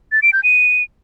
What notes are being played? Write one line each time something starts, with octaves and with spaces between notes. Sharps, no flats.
A6
D7
G6
D#7